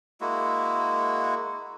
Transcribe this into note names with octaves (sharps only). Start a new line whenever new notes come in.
G#3 A#3 E4 F#4